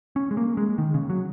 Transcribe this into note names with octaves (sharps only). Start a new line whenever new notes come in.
C#4
G#3
A#3
G#3
D#3
C#3
F#3